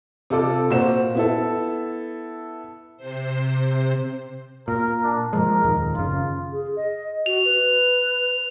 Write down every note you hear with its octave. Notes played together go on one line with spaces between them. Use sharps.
C3 F4 A4 D6
A#2 F#4 C5 E7
B3 E4 A4
C3 C5
A#2 A#4
D4
A#2 F3 G#3 A#4
D#1 F2 D#3
F#1 C#3 F4
G#4
D#5
F#4 F7
B4